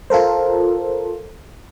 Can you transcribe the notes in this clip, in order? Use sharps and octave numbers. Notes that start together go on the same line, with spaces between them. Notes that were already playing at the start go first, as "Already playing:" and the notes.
F4 A4 A#4 C5